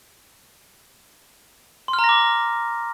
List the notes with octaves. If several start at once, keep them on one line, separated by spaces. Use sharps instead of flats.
C6
F6
A#5
A#6
D6